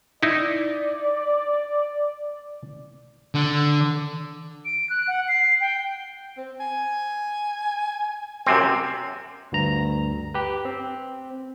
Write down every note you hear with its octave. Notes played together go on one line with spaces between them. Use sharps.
D#4 E4 D5
D3
D7
F#6
F#5
C7
G5
C4
G#5
F#2 C3 C4 G#5
D2 G2 A#5
G4 B4
C4